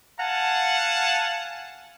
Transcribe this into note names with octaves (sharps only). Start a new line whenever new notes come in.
F5 F#5 G#5 A5